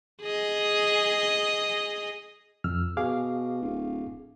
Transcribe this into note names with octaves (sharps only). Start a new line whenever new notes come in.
G#4 D#5
F2 E6 F6
B2 G#4 F5 D6
D1